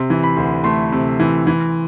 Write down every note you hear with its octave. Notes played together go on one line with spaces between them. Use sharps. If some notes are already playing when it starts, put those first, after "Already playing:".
Already playing: C3 C6
E3
B5
D2
A3 C6
C3
E3
E3